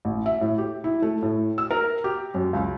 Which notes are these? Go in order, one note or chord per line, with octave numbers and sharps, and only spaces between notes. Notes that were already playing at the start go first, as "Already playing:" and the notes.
A1
E5
A2
G4
E4
A3
A2
E6
A#4
G4
F#2
C#2